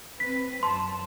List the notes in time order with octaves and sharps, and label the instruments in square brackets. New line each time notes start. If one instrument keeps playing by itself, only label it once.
[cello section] C4 B4 [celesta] B6
[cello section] F#2 [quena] A5 [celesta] C6